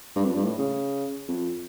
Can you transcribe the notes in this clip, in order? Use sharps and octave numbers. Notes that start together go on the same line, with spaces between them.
G2
F2
G2
A2
C#3
F2